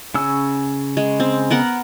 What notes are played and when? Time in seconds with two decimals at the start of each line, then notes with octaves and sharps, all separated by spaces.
0.14 C#3 C#4 E6
0.97 G#3
1.20 C4
1.50 B3 A#4 F#5